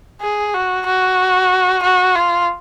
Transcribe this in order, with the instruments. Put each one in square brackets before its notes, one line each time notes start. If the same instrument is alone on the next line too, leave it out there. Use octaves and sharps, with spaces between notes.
[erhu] G#4
F#4
F#4
F#4
F4